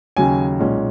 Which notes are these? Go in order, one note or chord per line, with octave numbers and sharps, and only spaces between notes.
D#2 C#3 F#3 C#4 G#5
B1 A#2 G#3 C#4